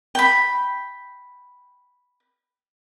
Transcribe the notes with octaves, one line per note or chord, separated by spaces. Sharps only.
G5 B5